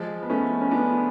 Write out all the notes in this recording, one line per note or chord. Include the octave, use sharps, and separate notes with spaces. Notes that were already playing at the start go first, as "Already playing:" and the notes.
Already playing: F3 G#3
B3
A3 C#4
C#4
B3 D4